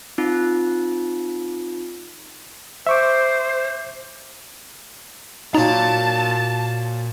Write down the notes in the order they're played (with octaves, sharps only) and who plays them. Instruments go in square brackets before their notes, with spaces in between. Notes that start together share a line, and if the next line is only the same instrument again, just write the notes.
[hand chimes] C4 D#4 F4
[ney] C5 [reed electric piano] E5 C#6 D6
[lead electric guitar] A#2 A#5 [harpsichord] F#3 F4 [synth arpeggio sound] D#4 [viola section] A5